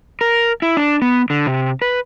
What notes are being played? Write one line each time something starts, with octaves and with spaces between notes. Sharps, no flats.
A#4
E4
D4
B3
D3
C3
B4